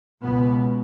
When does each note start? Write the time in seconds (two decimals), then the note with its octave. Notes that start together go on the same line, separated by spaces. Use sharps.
0.23 C#2 B2 B3